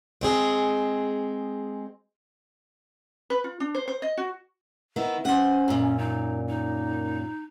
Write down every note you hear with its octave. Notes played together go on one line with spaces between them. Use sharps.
G#3 C4 G#4
B4
F4
D4
C5
C5
D#5
F#4
D#3 B3 E4
C#4 C5 F#5
F#2 A#2
D#4
D#4